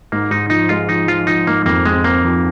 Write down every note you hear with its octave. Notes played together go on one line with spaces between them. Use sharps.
G#2 A#3
G#2 D#4
F3 D#4
G#3 F4
F3 D#4
F3 F4
F3 D#4
G#2 A#3
F2 A#3
G#3 C4
A#3 C4
F3